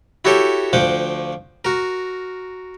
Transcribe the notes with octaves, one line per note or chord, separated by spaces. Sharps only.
E4 F#4 G4 A4 C#5 G5
D2 F3 F#5 G5 D6
F#4 A#4